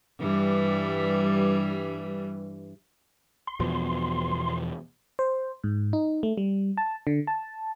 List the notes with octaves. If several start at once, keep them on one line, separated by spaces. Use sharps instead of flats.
G2 E3 G3
C6
E2 B2 F3
C5
G#2
D#4
A3
G3
A5
D3
A5